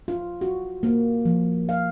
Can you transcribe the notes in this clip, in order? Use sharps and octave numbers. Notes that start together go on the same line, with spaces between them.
F4
F#4
A#3
F3
F5